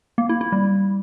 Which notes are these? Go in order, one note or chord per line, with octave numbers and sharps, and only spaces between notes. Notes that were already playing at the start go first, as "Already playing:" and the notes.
A#3
E4
E4
G3